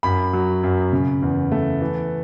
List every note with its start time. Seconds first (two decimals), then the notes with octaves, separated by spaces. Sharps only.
0.03 F#2 B5
0.33 F#3
0.63 F#2
0.92 C#3
1.22 E2
1.52 A3
1.82 E3